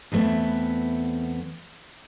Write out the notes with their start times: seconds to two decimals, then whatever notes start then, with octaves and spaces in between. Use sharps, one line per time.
0.12 E2 E3 A3 B3 C4